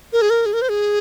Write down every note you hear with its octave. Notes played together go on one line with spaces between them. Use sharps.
A#4
G#4
A#4
G#4
A#4
C5
G#4